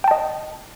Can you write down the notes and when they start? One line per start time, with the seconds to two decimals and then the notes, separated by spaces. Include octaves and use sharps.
0.04 G5
0.08 A5
0.11 D#5